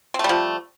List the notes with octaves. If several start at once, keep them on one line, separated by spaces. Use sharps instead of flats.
F3 G3 A3 C4